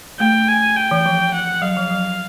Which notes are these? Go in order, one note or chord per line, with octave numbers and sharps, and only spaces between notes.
A3 G5
G#5
G5
E3
F3
F#5
F#3 F5
F3
F#3